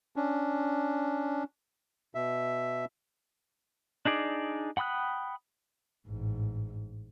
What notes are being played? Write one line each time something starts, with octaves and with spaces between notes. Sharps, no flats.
C#4 D4
B2 E5
D4 D#4 G#4 D5
F#5 G5 B5 D#6 F#6
A1 G#2